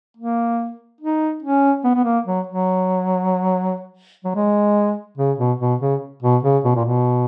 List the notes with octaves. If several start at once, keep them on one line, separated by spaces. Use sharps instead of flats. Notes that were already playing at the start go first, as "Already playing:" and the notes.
A#3
D#4
C#4
B3
B3
A#3
F#3
F#3
F#3
G#3
C#3
B2
B2
C#3
B2
C#3
B2
A#2
B2